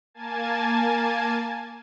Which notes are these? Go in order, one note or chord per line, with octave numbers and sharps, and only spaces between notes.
A#3 G#5 A5 G#6 A6